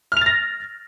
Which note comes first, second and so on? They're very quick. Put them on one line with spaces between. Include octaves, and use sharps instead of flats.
F6 F7 A6 A#6